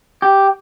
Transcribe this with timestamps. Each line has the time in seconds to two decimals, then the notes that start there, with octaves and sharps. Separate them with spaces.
0.22 G4